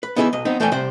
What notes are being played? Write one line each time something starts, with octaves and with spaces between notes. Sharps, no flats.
B4
B3 D#4 E4 G#4 A4 B4
B1 D#5
B3 C4 D#4
E2 A3 C5 D5 G5 G#5
C3 G3 C5 G5